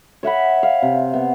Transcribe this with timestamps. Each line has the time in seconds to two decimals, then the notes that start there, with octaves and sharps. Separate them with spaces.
0.23 C#5 E5 F#5 B5
0.63 F5
0.82 C3
1.14 B3